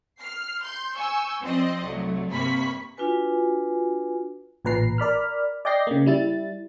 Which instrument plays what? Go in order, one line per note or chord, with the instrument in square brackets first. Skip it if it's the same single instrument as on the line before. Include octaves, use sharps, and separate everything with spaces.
[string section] F6 C7
C6 G6
G#5 C#6 E6 G6
F3 C4 C5 D5 D#5
C2 F#3 A3
G2 C3 A#3 B5 C#6 B6
[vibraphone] D4 F4 F#4 B4 G#5
[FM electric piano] A1 A#2 B4 A#5 C7
A#4 D5 B5 F6
D5 D#5 G5 G6 A#6 C7
C#3 A#3
G3 E4 A6